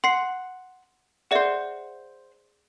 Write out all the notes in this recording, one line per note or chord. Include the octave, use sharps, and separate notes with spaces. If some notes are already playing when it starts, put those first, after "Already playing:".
F#5 C6 C7
G#4 C5 D5 E5 F#5